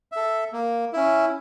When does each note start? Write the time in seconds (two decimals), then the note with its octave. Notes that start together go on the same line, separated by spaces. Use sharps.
0.12 A4 E5
0.53 A#3
0.93 C#4 E4